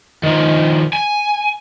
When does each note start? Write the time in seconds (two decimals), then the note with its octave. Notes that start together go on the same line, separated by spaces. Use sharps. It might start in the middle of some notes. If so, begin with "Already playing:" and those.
0.23 D#3 F3
0.93 G#5